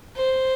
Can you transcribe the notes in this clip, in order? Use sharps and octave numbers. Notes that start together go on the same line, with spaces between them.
C5